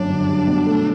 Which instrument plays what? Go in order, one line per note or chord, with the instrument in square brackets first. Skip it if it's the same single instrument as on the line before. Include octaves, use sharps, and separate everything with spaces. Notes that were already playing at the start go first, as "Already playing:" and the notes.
Already playing: [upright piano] G1 F#2 [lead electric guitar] D4
[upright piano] D3
G3
B2
A3